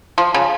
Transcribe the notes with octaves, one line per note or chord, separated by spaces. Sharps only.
F3
C#3